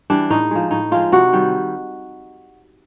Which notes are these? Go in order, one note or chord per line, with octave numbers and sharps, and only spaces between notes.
E3 G3 D4
A2 D#4
F3 G#3
A2 D#4
F3 G#3 F4
C3 F#4
D#3 G3